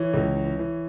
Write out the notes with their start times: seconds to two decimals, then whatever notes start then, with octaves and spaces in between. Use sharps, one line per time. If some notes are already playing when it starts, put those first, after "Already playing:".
Already playing: E3 C#5
0.14 C#2
0.36 E3
0.59 E3